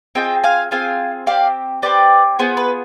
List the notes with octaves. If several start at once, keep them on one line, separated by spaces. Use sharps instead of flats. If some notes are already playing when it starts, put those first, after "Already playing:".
C4 F4 G#4 D#5 G5
F5 G#5
C4 F4 G#4 F5 G#5
C4 G4 D5 F5
C4 G4 B4 D5
B3 F4 G#4 C5
B4